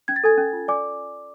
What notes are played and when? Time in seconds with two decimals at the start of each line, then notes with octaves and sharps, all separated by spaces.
0.08 C#4 G#6
0.16 A6
0.24 A4 G#5 G#6
0.38 C#4
0.53 F4
0.68 D5 G#5 D6